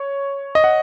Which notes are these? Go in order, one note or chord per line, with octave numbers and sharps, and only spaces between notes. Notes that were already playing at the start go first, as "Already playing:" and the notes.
Already playing: C#5
D#5
F#5